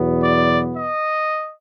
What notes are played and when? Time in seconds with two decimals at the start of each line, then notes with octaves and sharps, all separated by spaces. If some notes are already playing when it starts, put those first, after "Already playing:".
Already playing: E2 B2 F#3 B3
0.24 D5
0.78 D#5